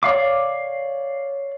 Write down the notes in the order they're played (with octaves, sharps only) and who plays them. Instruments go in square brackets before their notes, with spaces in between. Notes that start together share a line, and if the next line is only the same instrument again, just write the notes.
[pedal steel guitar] C#5 D5 F5 D6